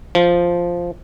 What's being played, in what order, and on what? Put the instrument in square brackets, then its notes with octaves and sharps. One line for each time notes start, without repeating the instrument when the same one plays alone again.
[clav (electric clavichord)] F3